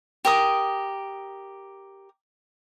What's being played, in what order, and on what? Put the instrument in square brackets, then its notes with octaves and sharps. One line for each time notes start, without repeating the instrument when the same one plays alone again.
[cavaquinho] G4 A#4 D#6